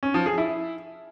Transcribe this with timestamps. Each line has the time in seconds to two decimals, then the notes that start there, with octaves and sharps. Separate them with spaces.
0.03 C#4
0.14 F3
0.26 G#4
0.38 E4